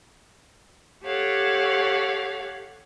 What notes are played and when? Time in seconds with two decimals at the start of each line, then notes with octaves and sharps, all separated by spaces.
1.05 G4 A4 C#5 F5 F#5